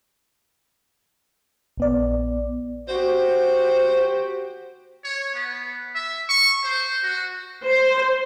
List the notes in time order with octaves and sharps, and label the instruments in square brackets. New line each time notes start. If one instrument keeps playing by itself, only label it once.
[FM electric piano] A#1 B3 D5
[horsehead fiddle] F#4 G4 [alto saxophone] C5
[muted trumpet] C#5
B3
E5
C#6
C5
F#4
[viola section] C5